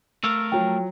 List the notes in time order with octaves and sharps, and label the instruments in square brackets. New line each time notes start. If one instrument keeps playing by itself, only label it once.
[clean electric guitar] A3 A#4 F5 [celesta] E6
[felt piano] F3 F#3 [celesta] G5